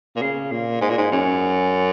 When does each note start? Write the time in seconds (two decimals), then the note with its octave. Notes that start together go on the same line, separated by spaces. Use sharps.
0.16 A#2
0.22 C#3
0.52 A#2
0.81 G#2
0.90 A#2
0.98 G#2
1.12 F#2